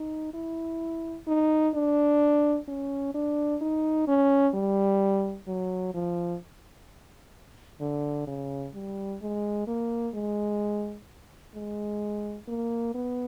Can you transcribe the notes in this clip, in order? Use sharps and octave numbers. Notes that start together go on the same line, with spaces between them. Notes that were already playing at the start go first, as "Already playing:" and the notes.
Already playing: D#4
E4
D#4
D4
C#4
D4
D#4
C#4
G3
F#3
F3
D3
C#3
G3
G#3
A#3
G#3
G#3
A#3
B3